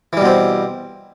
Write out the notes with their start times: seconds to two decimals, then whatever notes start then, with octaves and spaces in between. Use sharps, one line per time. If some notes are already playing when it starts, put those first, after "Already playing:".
0.13 E3
0.17 G3
0.21 B2
0.25 C4